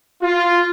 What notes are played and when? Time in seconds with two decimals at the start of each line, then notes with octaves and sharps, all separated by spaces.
0.22 F4